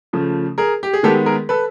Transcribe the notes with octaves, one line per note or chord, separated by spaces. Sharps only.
C#3 F3 A3
G#4 A#4
G4
G#4
D#3 G#3 B3 G4 A4
G#4 A#4
A4 B4